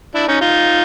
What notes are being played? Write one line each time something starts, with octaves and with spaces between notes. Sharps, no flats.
D4 E4
C#4 D#4
D#4 F4